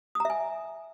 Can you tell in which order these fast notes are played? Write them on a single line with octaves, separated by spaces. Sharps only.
D#6 A#5 E5 G#5